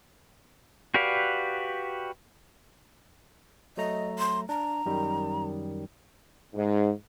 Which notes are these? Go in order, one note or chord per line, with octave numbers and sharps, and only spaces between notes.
F#4 G4 B4 D5 F5
F#3 A3 D#5 A#5
C6
D4 A#5
F#2 D#3 G3
G#2